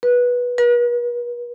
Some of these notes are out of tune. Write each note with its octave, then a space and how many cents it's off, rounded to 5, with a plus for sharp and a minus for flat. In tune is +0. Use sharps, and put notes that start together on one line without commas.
B4 -15
B4 -45